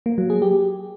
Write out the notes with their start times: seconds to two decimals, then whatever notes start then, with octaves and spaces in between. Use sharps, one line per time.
0.06 A#3
0.18 F#3
0.30 G#4
0.42 G4